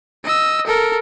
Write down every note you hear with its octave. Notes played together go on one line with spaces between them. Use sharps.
D#5 E6
A4 A#4